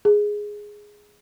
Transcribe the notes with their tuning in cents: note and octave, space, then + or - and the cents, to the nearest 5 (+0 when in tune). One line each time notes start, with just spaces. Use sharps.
G#4 +0